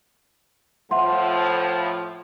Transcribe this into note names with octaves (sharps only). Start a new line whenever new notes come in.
A2 F3 E5 F#5 C6